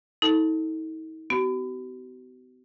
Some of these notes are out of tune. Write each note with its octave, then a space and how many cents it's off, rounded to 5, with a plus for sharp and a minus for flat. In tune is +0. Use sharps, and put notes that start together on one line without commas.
D#4 +45 A4 +0 A5 +0
B3 +40 F#4 +45